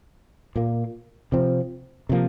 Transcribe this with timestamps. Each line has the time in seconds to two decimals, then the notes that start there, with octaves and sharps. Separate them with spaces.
0.56 A#2 A#3
1.32 C3 F3 C4
2.09 C3 F3 A#3